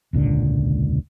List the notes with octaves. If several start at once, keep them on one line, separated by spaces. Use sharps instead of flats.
E1 C#2 A#2 D3